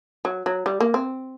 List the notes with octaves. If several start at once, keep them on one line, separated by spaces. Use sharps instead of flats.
F#3
F#3
G3
A#3
C4